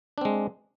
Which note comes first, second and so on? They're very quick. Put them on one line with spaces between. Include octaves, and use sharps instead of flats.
D4 C4 G#3